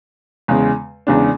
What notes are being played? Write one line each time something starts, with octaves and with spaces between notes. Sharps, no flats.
E2 C#3 G#3
E2 C#3 G#3 D4